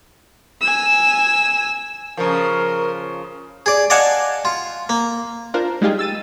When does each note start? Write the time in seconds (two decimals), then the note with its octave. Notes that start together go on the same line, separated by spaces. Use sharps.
0.62 G#5 E6
2.17 C#3 F3 A#4
3.66 G#4 D5
3.90 D5 D#5 F5 F#5 G#5 A5
4.45 F4
4.89 A#3
5.54 D4 F4 A#4 C5
5.81 G3 G#3 D#4 F4 G4 G#4
5.99 E6 A6 D#7